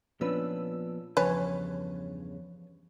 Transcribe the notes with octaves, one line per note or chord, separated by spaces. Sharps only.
A#2 F3 B3 C#4 D4 B4 E6
E2 G2 C#3 F3 B4 C#5 G#5 A5